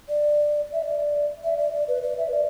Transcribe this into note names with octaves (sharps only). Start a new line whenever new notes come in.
D5
E5
D5
E5
D5
D5
B4
D5
E5
B4
D5